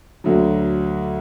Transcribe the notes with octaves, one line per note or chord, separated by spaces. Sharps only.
D2 D3 F#3